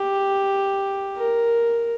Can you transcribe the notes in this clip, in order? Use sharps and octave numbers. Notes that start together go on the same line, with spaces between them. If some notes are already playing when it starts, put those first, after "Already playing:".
Already playing: G4
A#4